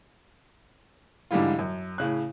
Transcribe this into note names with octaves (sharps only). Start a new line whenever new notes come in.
G#2 D3 E3 G3 E4 F4
F#2
A2 C#3 F#6